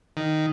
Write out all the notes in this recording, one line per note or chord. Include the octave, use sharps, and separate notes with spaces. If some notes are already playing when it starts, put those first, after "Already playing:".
D#3